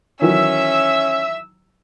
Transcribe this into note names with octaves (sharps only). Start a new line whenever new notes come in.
D#3 E3 F#3 C#4 E5 E6